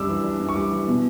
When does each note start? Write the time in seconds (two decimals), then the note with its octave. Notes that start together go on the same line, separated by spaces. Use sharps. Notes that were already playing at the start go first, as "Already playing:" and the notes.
Already playing: F#2 G3 D4 D6 E6
0.09 E3
0.24 D4
0.40 F#2
0.49 C#6
0.55 G3 D6
0.71 E3
0.87 B2